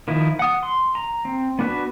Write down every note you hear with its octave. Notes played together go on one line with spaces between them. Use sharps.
D#3 F3 E4
F#5 D#6
C6
A#5
C4
B3 D4 F#4 B4